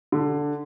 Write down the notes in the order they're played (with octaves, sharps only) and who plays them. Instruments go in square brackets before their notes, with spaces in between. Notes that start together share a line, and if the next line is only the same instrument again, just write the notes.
[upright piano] D3